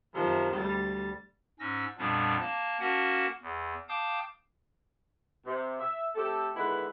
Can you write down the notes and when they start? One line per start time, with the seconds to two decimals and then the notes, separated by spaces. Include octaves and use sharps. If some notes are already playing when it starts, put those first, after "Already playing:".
0.14 F#2 C3 D#3 F3
0.54 D2 G3 A6
1.60 G#2 C#4 E6 A#6
1.98 F2 A#2 F3 G3 B3 D4
2.40 A#3 A5
2.79 A#3 C#4 F#4 A#4 F#5 A5
3.42 E2
3.89 F5 G5 A5 D6 D#6 G6
5.46 C3
5.80 E5
6.16 A3 C4 G4 A4
6.56 D3 D#3 G#3 B3 E4 B4